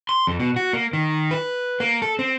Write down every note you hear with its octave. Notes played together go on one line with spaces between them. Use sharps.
C6
F2
B2
F#4
A#3
D#3
B4
A#3
A4
C4